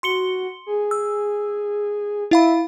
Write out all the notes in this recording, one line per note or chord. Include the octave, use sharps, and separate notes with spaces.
F#4 C6 C#7 G7
G#4
E6
E4 E5 F5 B5